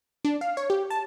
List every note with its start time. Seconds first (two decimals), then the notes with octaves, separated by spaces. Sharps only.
0.25 D4
0.41 F5
0.57 C#5
0.70 G4
0.90 A5